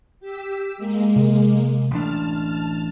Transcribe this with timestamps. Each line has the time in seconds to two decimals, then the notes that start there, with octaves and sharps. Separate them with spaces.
0.20 G4 E6 B6
0.78 G#3 A#3
1.16 C3
1.91 A1 D4 A5 F6